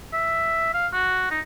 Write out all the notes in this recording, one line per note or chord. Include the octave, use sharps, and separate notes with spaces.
E5
F5
F#4
D#4